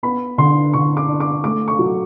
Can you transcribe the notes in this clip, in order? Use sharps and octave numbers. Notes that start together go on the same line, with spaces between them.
B3 B5
D3 C6
D3 C#6
D6
D4
D6
A3 D6
C#6
F#3